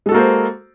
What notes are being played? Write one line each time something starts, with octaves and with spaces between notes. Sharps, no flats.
G#3 A#3 F#4 A4 C5